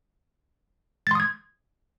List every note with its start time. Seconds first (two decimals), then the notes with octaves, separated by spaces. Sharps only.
1.07 A6
1.11 C6
1.15 D#6
1.20 G#6